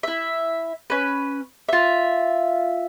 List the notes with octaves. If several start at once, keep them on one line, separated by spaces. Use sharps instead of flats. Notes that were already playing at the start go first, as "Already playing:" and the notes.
E4 E5
C#4 B4
F4 E5